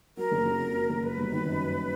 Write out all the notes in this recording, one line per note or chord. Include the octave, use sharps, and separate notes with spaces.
F#3 A#4
F#1
C#3
F2
F#3
F#1
F#3 B4
G1
D#3
F#2
F#3